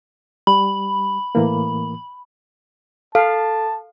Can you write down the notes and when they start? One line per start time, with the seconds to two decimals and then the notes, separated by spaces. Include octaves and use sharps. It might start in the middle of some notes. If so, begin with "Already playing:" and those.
0.47 G3 B5
1.35 A2 E3 A#3
3.15 A4 F5 A5